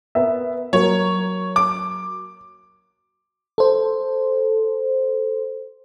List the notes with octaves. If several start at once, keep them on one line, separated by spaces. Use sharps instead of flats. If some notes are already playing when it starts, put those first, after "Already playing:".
B3 A#4 E5
F#3 A#3 C#5
D6
A4 C5